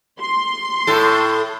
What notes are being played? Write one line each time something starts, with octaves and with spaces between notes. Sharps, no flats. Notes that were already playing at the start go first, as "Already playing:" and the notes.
C6
A2 A4